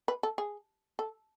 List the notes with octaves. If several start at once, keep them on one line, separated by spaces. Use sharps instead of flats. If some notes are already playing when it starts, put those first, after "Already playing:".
B4
A4
G#4
A4